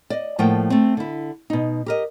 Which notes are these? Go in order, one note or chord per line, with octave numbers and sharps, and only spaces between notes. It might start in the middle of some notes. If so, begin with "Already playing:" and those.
D5 D#5
A2 F3 A3 A#3 F#5 G5
A3 C4
D3 E4
B2 D#4
G4 A#4 D#5